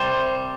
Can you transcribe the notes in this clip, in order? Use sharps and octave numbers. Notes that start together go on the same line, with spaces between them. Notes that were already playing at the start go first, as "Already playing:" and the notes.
Already playing: C2 C3 G3 C5